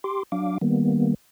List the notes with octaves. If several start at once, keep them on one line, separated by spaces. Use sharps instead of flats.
G4 C6 D6
F#3 D4 F5 D6
D#3 G3 A#3 B3